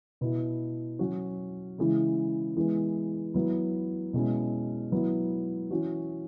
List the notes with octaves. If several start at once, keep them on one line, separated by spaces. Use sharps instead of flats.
B2 B3 E4
F#3 C#4 F#4
C#3 E3 G#3 E4
E3 G#3 B3
F#3 B3 E4
B2 G#3 C#4 E4
F#3 B3 E4
E3 C#4 F#4